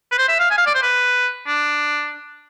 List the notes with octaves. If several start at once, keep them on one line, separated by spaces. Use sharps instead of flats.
B4
C5
E5
F5
G#5
F5
D5
C5
B4
D4